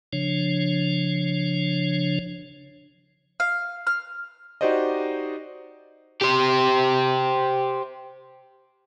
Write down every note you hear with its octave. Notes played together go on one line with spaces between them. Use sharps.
C#3 F3 D4 C#5
F5
F6
D#4 F#4 G4 C5 D5 D#5
G4 C5